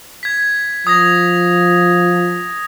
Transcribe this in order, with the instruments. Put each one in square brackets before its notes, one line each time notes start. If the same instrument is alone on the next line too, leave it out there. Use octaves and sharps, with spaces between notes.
[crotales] G#6 B6
[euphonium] F3 [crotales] D#6 G#6 A#6